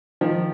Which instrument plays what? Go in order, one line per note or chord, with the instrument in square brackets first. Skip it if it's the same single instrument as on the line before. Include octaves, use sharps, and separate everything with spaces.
[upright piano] D#3 F3